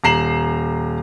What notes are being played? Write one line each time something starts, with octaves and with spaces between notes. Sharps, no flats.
D#1 A#5 C7 E7 F#7